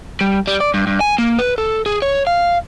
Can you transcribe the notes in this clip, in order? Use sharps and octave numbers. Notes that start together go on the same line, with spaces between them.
G3
G3
D5
G2
G2
G#5
A#3
B4
A4
G#4
C#5
F5